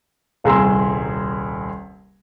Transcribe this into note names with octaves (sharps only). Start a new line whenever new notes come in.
D#1 C2 G#4 A#5 C6 E6